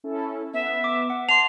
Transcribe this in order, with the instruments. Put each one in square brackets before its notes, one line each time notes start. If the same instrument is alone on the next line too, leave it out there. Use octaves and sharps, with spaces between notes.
[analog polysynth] C#4 E4 A4
[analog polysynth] B3 [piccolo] E5
[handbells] D6
F#5
[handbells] A5 C6 [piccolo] C7 [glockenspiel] F7